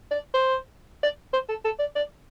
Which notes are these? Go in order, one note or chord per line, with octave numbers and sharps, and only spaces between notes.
D5
C5
D5
C5
A4
A4
D5
D5